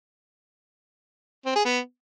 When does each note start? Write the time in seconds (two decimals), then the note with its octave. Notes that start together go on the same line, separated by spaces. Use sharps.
1.46 C4
1.56 G#4
1.65 B3